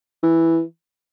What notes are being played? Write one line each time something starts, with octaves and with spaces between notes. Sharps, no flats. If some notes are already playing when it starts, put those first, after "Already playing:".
E3